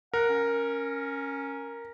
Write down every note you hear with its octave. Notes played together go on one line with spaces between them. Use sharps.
A#4 F#5
C#4